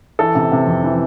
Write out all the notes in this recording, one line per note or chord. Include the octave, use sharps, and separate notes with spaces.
E3 A4
C3
C3
F2
E3